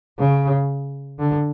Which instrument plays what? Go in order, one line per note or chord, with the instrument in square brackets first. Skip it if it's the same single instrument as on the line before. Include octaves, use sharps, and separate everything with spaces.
[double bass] C#3
D3